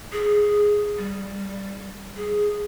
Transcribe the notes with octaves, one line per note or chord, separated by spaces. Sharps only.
G#4
G3
G#4